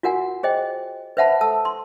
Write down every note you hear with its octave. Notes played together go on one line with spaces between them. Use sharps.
F4 F#4 A#4 F#5 G#5
G#4 C5 D#5 G5
B4 C5 E5 F#5 A5 B5
A4 A5 E6
C6